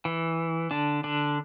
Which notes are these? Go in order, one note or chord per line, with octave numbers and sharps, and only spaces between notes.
E3
D3 D4
D3 D4